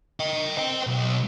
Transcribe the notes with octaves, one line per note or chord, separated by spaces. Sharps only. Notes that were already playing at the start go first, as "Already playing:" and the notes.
D#5 G5
C5 G5
B1